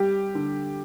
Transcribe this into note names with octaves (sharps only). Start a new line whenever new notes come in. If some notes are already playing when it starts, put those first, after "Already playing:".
Already playing: G3 G4
D3